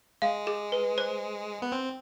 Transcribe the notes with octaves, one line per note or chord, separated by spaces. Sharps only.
G#3 F5
G#4
B4
C5
B3
C4